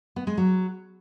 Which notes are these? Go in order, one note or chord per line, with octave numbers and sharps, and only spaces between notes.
B3
G#3
F#3